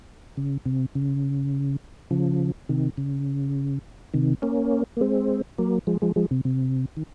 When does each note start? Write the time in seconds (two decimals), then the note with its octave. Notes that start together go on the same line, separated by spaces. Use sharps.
0.37 C#3
0.66 C3
0.95 C#3
2.11 C#3 F3
2.69 C3 D#3
2.97 C#3
4.14 C3 D#3
4.42 A#3 C#4
4.97 A#3
5.01 G#3 C4
5.58 F#3 A#3
5.87 F3 G#3
6.02 F3 G#3
6.16 F3 G#3
6.31 C3
6.45 C3
6.97 D#3